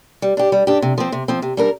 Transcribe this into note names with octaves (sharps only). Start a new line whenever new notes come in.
G3
D4 G4
G3
D4 G4
C3
F3 C4
C3
F3 C4
C3
G3 D4 A#4